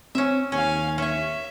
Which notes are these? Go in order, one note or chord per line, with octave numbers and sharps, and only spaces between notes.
C4 C#4 E5
D#2 C#4 F5 G#5
C#4 C#5 E5